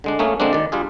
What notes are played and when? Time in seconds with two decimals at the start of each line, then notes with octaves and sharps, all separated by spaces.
0.04 D3 G#3 D4
0.19 A3 A#3 C#4 G#4
0.40 D3 G#3 A#3 C4 D4
0.53 D#3 D5
0.72 G3 D4 F4 G#4